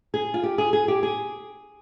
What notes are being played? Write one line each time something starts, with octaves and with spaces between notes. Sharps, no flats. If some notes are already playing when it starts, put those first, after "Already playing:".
G#4
F4
G4
G#4
G#4
G4
G#4